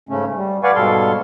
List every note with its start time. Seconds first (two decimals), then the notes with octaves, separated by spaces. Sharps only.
0.09 G#2 C#3 A3 C#4
0.36 G3
0.63 B4 D5 F5 F#5 G#5 C#6
0.75 G#2 B2 G3 A4 F5 C6